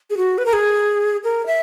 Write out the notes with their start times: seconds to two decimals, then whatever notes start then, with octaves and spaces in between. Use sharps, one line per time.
0.10 G#4
0.17 F#4
0.38 B4
0.46 A#4
0.53 G#4
1.24 A#4
1.46 E5